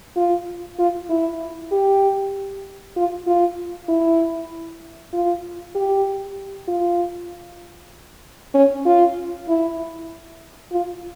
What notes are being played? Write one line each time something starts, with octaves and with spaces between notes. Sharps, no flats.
F4
F4
E4
G4
F4
F4
E4
F4
G4
F4
C#4
F4
E4
F4